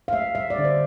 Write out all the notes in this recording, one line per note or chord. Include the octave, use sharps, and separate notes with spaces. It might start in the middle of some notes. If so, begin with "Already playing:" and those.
F5
A3 E5
G3 E5
D5
D3
C5